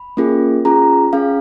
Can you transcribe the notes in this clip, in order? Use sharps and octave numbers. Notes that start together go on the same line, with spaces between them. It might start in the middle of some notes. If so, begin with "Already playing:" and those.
Already playing: B5
A#3 C#4 F4 G#4
C#4 F4 G#4 A#5
C#4 G#4 F5